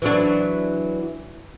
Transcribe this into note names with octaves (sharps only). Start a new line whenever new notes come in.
E3 F#3 D4